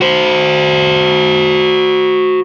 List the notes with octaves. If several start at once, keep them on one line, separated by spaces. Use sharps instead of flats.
F#4 C5